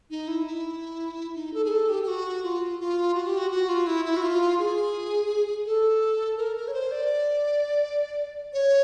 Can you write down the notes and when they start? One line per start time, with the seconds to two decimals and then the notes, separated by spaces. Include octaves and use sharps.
0.10 D#4
0.28 E4
0.46 E4
1.35 D#4
1.54 A4
1.64 G#4
1.71 A4
1.89 G4
2.03 G4
2.08 F#4
2.44 F4
2.80 F4
3.14 F#4
3.26 G4
3.38 F#4
3.51 F#4
3.69 F4
3.87 E4
4.05 E4
4.16 F#4
4.22 F4
4.59 G#4
5.66 A4
6.37 A#4
6.56 A#4
6.68 C#5
6.74 C5
6.91 D5
8.53 C#5